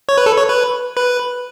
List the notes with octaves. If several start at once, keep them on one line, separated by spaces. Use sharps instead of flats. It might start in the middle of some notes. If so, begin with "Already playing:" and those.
C#5
B4
A4
C#5
B4
B4